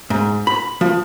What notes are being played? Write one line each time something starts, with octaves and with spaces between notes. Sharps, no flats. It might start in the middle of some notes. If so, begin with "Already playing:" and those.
G#2
B5
F3